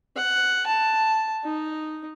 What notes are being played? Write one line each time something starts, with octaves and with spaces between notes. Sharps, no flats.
F#5
A5
D#4